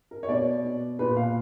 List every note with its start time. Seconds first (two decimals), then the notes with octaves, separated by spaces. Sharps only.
0.11 A#4
0.23 C#5
0.29 B2 D5
0.64 B2
0.99 A#2 B4
1.17 F5